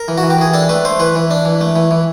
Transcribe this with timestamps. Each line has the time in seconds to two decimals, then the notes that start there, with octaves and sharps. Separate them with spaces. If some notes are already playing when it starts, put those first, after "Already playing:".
Already playing: A#4
0.08 E3
0.18 F#4
0.23 E3
0.30 G4
0.38 E3 G#4
0.54 D4 A4
0.69 A3 B4
0.85 A3 C5
1.00 E3 B4
1.15 E3
1.31 D4
1.45 E3
1.61 A3
1.76 E3
1.91 E3